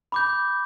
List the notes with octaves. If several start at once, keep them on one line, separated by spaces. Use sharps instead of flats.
B5 D6 G6